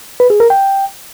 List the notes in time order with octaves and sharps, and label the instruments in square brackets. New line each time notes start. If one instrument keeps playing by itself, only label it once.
[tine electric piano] B4
G#4
A#4
G5